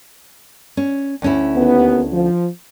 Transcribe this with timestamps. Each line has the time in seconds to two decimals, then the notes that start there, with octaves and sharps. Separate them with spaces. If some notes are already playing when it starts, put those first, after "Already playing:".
0.77 C#4
1.22 D2 C#4 E4
1.55 D#2 B3
2.13 F3